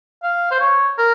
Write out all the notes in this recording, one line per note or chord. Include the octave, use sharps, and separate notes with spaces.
F5
C5
C#5
A#4